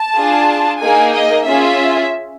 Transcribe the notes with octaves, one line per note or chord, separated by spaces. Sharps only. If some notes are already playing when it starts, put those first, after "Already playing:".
Already playing: A5
D4 F4 G#4
A#3 D#4 G#4 G#5
D#5
C#4 F4 G#4 E5